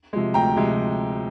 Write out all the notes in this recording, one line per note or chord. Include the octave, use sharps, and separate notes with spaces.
C3 F3 G#3
D2 G5 A#5
C3 F3 G#3